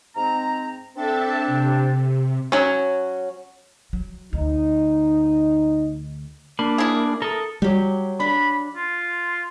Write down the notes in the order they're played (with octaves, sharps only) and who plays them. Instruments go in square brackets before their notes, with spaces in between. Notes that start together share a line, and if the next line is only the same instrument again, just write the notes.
[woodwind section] G#2 C4 A#5
[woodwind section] C4 D4 [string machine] A4 E5 A5
[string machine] C3
[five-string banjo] F#3 C#4
[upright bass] F#3
[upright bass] D2 [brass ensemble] D#4
[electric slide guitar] A#3 [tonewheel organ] D4 [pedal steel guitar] B5
[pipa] E4 G#4
[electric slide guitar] A4 [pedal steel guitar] A#4 D#6
[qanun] F#3 G4 [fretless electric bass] G3
[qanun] D4 [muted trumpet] B5
[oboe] F4